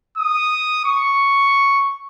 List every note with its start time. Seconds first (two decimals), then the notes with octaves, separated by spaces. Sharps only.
0.17 D#6
0.85 C#6